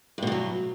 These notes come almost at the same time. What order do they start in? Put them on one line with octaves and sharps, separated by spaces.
G2 B2 D#3 F#3